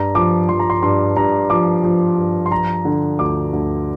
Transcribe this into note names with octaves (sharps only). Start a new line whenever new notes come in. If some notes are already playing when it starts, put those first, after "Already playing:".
Already playing: G2 A#5
F3 D6
F3 C6
A#5
C6
G2 C6
G2 A#5
F3 D6
F3
G2
C6
F3 A#5
D3
D2 D6
D2